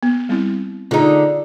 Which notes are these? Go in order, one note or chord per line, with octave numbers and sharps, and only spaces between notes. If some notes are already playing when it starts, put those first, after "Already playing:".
B3
G3 C4 E4
D3 D#4 F4 G#4